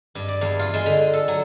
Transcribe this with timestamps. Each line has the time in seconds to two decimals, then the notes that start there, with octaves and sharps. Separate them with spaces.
0.15 G2
0.28 D5
0.41 E2
0.59 F4
0.74 G#3
0.86 D3
1.14 A4
1.28 F#3